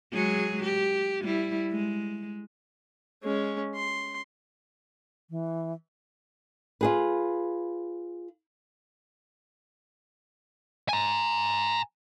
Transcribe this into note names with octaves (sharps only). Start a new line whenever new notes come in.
F#3 G#3 G#4
G4
G3 E4
G#3
G#3 C#4
C6
E3
F4 G#4 B4
G#5 A#5